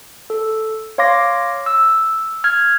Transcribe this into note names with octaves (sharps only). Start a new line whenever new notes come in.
A4
C#5 F5 C6 D6 A#6
E6
F6 G#6